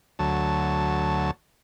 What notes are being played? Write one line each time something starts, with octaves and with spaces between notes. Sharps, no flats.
D2 F#3 A5